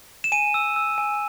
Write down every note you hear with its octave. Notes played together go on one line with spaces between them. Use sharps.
E7
G#5 D#7
E6
E6
G#5